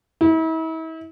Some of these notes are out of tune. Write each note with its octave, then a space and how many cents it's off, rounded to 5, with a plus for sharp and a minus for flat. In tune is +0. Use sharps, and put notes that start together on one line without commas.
E4 -40